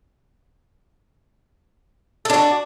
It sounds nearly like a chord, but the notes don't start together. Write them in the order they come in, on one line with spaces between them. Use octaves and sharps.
A4 D4 F#4